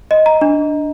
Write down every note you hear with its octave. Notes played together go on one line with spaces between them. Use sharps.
D#5
A#5
D4